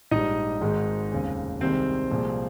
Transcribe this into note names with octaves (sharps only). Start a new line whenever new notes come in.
A#1 G#2 G3 D#4 D#5
G#1 G#2 D#3 G#3
F1 D#2 C#3 G#3
C2 C3 D#3 G#3 C4 C5
C2 A#2 F3 G#3